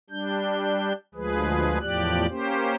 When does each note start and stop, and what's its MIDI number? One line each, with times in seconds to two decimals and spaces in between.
0.10 0.93 55
0.10 0.93 62
0.10 0.93 91
1.15 1.78 38
1.15 1.78 53
1.15 1.78 56
1.15 1.78 68
1.15 1.78 71
1.81 2.26 40
1.81 2.26 45
1.81 2.26 53
1.81 2.26 67
1.81 2.26 74
1.81 2.26 90
2.29 2.76 58
2.29 2.76 61
2.29 2.76 67
2.29 2.76 72